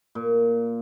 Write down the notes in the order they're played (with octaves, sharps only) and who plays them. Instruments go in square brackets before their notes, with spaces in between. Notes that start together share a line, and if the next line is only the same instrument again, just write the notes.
[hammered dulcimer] A#2